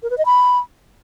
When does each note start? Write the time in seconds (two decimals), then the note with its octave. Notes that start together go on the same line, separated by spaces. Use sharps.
0.03 A#4
0.10 B4
0.18 D#5
0.25 B5